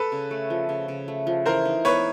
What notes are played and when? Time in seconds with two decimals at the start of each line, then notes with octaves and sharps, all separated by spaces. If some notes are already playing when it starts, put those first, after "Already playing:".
Already playing: A4 B4
0.12 C#3
0.31 A3
0.50 F3
0.69 C#3
0.88 C#3
1.08 A3
1.27 F3
1.46 E3 A#4 C5
1.65 D#4
1.85 B3 B4 C#5